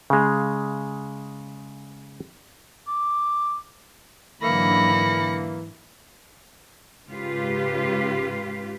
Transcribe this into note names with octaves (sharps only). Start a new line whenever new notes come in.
C#3 G#3
D6
G#2 D3 E3 F#3 A#3 B5 A#6 C#7
G#2 C#3 F4 G4 B4